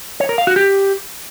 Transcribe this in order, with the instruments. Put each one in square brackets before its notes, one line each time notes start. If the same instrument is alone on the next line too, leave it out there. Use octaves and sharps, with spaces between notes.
[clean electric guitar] C#5
A#4
F5
F#4
G4